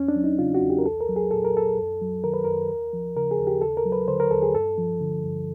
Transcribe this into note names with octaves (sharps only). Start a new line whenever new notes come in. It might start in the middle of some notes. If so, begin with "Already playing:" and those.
Already playing: E2 C#4
D4
F#3
D#4
C#3 F4
F#4
E2
G4
A#4
C2 A4
A#4
F#3
G#4
A#2 A4
A#4
C2 A4
F#2
F#3
D#3 A#4
B4
F#2 A#4
D#2
F3
C#3 A#4
G#4
D#2
G4
D#2 A4
A#4
F#3
B4
D3 C5
A#4
D#2 A4
G#4
G2 A4
F3
D3
G2